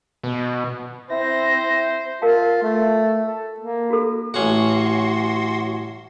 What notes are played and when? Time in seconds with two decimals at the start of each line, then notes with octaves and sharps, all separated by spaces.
0.23 B2
1.11 C4 E4 C5 A#6
2.22 F4 A#4 F5 A5
2.63 A3
3.23 A4
3.60 A#3
3.90 F#4 A4
4.34 A1 C#4 F#4 F#5 C6